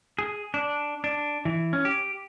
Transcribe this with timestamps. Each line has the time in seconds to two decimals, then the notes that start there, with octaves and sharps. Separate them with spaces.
0.19 G#4
0.54 D4
1.04 D4
1.45 E3
1.73 C#4
1.85 G4